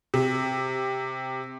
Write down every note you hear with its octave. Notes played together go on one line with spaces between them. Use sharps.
C3